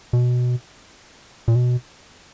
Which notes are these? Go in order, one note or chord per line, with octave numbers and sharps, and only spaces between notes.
B2
A#2
B2